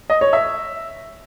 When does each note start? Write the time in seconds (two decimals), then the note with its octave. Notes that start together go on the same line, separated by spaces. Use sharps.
0.10 D#5
0.21 C#5
0.33 E5